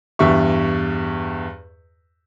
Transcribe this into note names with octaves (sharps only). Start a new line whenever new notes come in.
E2 G2 G4 E5 C#6